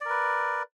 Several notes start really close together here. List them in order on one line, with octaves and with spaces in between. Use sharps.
D5 A#4 B4